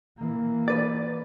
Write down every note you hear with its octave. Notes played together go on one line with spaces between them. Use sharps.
E3 A#3
B4 D5